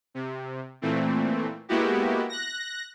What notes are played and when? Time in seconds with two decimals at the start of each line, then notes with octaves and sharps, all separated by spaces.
0.14 C3
0.82 A#2 E3 A3 C4
1.69 G#3 A#3 B3 E4 F#4 G4
2.29 F#6 A#6